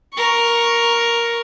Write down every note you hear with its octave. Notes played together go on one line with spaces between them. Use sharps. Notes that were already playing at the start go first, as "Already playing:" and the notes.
A#4 C#6